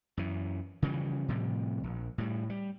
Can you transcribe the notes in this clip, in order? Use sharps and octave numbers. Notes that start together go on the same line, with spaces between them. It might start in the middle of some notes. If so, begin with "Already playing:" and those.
F#2 E3
C#3 E3 F3 G3
A2 C3 F3 G3
A#1
A2 G3
G3